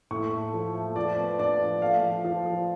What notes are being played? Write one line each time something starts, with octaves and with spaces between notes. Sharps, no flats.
A2 C#6
A3
F3
A3
F3 D5
B3
D4 D5
F3
A3 F5
F3
F3
F3